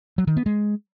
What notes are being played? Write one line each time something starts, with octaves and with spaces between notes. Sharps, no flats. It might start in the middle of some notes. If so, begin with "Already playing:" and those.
F#3
D#3
B3
G#3